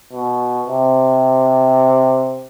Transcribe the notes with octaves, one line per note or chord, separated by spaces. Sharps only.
B2
C3